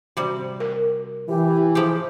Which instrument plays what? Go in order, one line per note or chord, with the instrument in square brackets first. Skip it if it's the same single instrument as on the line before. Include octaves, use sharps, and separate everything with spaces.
[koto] C3 G3 [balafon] F#4
[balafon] A#4
[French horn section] E3 [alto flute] G4
[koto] F3 G4 [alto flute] G#4